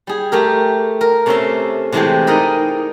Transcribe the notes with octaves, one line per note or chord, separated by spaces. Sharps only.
G3 G#4
A3 G4 A#4
A#4
C3 A3 C#4 A4 E5 C6
C3 E3 G#3 A3 D4 G4
D#4 A#4 D5 D#5 B5